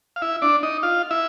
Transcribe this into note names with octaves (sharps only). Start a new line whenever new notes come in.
F5
E4 E5
D4 D5
D#4 D#5
F4 F5
E4 E5